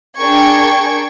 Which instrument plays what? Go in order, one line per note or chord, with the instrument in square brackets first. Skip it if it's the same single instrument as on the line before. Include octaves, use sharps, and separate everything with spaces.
[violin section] D4 G#4 A#4 G5 C#6 G#6